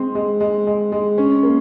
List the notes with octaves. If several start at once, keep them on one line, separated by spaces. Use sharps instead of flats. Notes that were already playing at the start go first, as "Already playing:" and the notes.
Already playing: G#3 C4
G#3
G#3
G#3
G#3
C#4
A#3